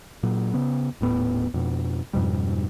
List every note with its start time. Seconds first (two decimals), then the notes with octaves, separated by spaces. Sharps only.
0.23 A#2 F#3
0.54 C#3 B3
1.01 D#1 A2 B3
1.54 F2 B2
2.13 F2 G#2 B2 G3